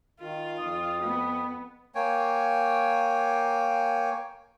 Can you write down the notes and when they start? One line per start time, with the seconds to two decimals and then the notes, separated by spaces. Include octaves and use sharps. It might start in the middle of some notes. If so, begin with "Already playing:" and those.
0.20 D#3 F4
0.58 F2 D#6
1.02 B3
1.95 A#3 C#5 G5 G#5